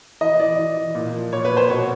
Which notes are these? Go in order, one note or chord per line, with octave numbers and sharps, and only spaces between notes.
E3 D#5
E3 D5
E3
E3
A#2
F3
A#2 C#5
B4
A#2
C5
B2 C#5